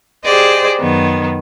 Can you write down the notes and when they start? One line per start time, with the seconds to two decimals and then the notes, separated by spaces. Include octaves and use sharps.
0.24 G4 G#4 C5 D5 D#5
0.79 F#2 D#3 B3